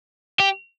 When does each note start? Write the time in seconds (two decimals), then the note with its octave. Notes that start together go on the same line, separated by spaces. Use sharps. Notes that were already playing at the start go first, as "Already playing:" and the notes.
0.40 G4